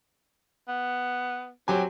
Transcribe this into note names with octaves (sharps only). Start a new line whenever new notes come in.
B3
F#3 C4 G4 G#5